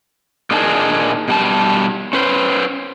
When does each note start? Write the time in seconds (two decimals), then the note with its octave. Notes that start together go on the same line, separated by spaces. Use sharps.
0.51 A#2 D4 D#4 G#4 A#4 A5
1.28 B2 G3 A5
2.13 C#4 B4 C5